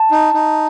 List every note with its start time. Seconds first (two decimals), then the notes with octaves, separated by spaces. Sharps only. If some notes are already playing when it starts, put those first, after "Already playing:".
Already playing: A5
0.11 D#4
0.34 D#4